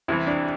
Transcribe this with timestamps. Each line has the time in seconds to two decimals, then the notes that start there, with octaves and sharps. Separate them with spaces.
0.08 C2 C3 E3 E4
0.27 D4